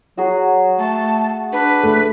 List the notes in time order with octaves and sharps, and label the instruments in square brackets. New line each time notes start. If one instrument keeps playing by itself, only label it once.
[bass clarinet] F#3 [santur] F#4 G#4
[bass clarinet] A3 [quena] A5
[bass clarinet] D4 [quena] B4
[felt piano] A3